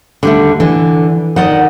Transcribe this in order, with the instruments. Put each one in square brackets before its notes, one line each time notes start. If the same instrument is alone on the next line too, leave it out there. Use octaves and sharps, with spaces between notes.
[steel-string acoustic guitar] D#2 [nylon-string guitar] D3 G3 A3
[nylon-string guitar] D3 [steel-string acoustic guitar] E3
[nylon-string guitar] D#3 [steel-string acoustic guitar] D5 D#5 F#5